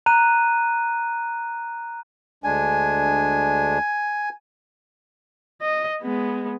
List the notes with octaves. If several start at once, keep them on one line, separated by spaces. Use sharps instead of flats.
A#5 F#6 D#7
D2 G#3 D4 G#5
D#5
G#3 B3